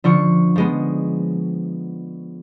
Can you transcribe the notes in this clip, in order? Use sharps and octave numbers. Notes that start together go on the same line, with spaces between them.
D3 F3 F4 C#6
F3 G#3 B3